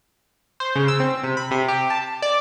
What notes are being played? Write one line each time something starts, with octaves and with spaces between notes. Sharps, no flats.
C5
C#3
E6
C4
C3
B5
C3
G4
A5
D5